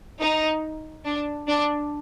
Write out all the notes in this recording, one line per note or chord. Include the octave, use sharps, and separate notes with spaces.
D#4
D4
D4